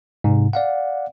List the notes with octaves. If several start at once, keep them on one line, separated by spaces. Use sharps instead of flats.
G#2 C3
D5 F5 F#5